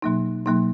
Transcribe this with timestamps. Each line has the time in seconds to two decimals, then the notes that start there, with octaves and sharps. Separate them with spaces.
0.02 B2 F#3 A#3 D#4
0.46 B2 F#3 A#3 D#4